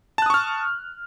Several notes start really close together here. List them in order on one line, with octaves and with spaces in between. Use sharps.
A5 F#6 D#6 C#6 F6